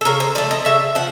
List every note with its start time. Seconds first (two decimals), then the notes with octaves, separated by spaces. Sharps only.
0.01 A4
0.05 C#3 A#4
0.20 C5
0.35 F3 D5
0.38 A3
0.51 D#5
0.65 C#3 E5
0.95 F3 F#5